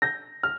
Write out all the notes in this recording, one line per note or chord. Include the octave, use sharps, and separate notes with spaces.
G6 A#6
F6